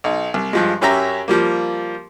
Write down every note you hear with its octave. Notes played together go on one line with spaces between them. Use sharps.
B1 D#4
C2
G2 F3 G#3
F#2 C#4 G4 E5 A#5 E6
F3 G3 A#3